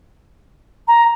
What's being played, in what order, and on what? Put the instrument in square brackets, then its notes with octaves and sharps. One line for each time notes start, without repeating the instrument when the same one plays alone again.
[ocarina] A#5